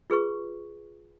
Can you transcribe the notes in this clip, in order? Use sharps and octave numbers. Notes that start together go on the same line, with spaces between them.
F4 G#4 B4 C#6